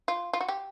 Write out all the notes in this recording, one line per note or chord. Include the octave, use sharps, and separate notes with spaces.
F4
F4
F#4
G4